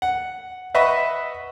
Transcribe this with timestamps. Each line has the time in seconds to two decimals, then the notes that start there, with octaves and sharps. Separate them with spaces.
0.02 F#5
0.74 B4 D#5 E5 F#5 B5 C#6